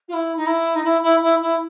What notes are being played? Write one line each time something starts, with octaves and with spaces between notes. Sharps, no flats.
F4
E4
D#4
E4
D#4
E4
E4
E4
E4